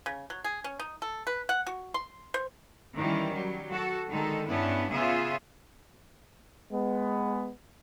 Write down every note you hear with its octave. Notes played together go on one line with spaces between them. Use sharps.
C#3
F#3
G#4
C#4
D#4
A4
B4
F#5
F#4
C6
C5
D#3 E3 G3 C#4
F#3 G3
F#4 A4
D3 D#3 G#3 D#4 A4
G2 B3 C#4 D4 E4 B4
C#3 B3 C#4 F4 G#4 E5
G#3 B3